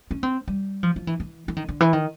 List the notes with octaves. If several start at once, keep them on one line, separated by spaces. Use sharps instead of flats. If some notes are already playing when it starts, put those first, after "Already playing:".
C#4
C4
G3
F3
F3
E3
E3
E3
D#3
D3
E3
D#3